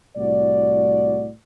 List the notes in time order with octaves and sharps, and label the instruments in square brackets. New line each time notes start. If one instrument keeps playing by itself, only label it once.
[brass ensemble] C2 A2 F#4 D5